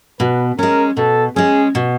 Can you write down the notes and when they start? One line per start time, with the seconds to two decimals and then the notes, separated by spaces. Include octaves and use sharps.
0.20 B2 B4
0.59 G#3 C#4 A#4
0.97 B2 A4
1.36 G#3 C#4 G#4
1.75 B2